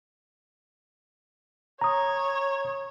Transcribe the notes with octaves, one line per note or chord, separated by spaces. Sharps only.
C#5 A#5 D#6